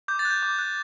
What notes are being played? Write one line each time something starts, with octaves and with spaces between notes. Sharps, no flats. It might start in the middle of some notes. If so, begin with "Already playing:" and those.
D6 G6
A6
F#6
G6
D6
F#6